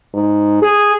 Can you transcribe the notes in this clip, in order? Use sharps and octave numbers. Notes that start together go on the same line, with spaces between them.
G#2
G#4